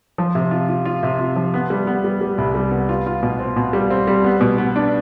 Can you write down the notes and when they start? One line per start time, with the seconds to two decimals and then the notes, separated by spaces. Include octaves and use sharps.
0.18 F3
0.35 C3
0.51 F4
0.69 F4
0.85 F4
1.03 C3
1.19 F4
1.36 F3
1.54 B3
1.70 G3
1.87 B3
2.04 G3
2.21 G3
2.38 C2
2.55 G3
2.71 B3
2.89 F4
3.06 F4
3.23 B2
3.39 C4
3.56 B2
3.73 G3
3.90 C4
4.07 G3
4.24 B3
4.41 B2
4.58 B3
4.76 D4